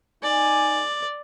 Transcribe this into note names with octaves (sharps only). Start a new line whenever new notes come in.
D#4 D5 G#5